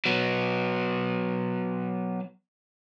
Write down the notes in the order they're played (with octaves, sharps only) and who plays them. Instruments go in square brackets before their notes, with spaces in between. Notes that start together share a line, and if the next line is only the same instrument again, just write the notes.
[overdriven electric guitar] F#3 B3